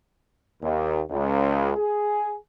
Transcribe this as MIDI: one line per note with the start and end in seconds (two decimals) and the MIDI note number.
0.62 1.01 39
1.10 1.71 37
1.77 2.36 68